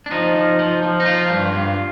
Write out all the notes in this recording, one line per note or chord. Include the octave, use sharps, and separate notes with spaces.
D4
F3 D#4
F3
F3
F3
D#4
F3 F4
G2
G2